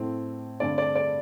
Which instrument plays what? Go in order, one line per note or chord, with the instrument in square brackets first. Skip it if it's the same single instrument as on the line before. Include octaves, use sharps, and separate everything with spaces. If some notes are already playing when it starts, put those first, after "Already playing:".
Already playing: [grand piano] A2 A3 C4
G2 D3 A3 C4 D5
D5
D5